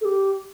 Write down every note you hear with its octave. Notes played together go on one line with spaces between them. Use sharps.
A4
G4